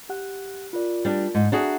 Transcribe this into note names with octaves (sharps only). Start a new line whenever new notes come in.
G4 F#5 F#6
F4 A#4 D5
G3 D4
G#2
D4 F#4 G#4 E5 A#5